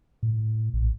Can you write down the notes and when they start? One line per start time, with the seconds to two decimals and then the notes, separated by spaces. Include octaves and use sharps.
0.23 A2
0.74 A#1